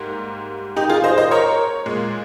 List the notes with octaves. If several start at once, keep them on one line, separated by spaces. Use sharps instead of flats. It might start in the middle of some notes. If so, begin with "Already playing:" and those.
Already playing: G#2 G3 A#3
D#4 G4
F4 G#4
C5 D#5
C5 D#5
A#4 C#5
A#2 G#3